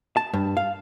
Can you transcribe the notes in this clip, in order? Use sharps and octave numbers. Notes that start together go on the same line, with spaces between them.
A5
G2
F5